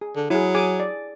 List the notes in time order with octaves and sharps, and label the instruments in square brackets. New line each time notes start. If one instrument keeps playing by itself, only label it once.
[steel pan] G#4
[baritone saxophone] D3
[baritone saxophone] F#3 [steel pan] E4 G#4
[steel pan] G#4 G#5 D6
D5